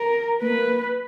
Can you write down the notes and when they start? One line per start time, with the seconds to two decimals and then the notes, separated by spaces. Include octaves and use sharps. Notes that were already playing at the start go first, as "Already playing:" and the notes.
Already playing: A#4
0.42 A#3 B4